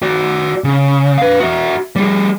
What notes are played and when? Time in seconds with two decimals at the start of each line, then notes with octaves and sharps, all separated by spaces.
0.02 F#4 D5
0.64 C#3
1.18 B4 F5
1.40 F#4 E5
1.96 G3 G#4